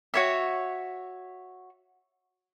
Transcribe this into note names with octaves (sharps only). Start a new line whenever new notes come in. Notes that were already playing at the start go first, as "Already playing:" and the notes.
F#4 C#5 E5